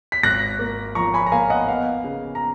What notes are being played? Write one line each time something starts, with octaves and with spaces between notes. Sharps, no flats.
B6
G#1 F#6 A#6
A#3
F3 A#5 C#6
G#5 B5
A#5
A#3 F5 G#5
D#5 F#5
B3 F5
C#3
A#5